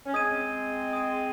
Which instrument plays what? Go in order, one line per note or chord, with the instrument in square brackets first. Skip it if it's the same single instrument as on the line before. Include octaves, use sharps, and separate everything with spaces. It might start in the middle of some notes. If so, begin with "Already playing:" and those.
[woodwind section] C#4
[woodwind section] G#3 C4 [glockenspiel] D#6 G#6 D#7
[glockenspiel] D#6 G#6 D#7